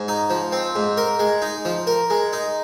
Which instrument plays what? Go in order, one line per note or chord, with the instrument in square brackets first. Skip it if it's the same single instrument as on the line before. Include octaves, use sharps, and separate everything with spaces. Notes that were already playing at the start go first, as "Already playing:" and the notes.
Already playing: [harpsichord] G#2
D#4
F3
C4
G#2
A#4
G#3
D#4
F3
A#4
G#3
D#4